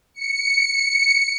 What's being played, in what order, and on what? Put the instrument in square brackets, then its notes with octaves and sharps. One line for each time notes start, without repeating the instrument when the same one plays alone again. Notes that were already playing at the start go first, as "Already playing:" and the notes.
[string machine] C#7